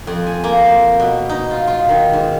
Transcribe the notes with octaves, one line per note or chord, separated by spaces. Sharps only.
F2
G#5
A#3
C5
B2
D#4
F4
F4
D#3
G#2